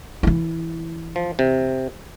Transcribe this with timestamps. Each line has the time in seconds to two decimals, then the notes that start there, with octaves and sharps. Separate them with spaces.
0.23 E3 E4
1.16 F3
1.39 C3